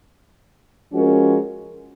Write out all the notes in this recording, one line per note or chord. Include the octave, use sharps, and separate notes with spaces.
F3 G#3 C#4 F#4 A#4